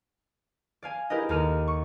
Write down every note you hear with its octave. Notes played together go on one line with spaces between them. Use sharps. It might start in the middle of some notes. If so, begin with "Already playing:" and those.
D5 F5 G#5
E4 G4 G#4 A#4 B4 D#5
D#2 A4 A#5 F6 D#7
C#6